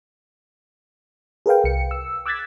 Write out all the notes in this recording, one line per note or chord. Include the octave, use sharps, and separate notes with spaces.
G#4 A#4 B4 F5 G5
C2 C#7
E6
D6 E6 F#6 G#6 A6 B6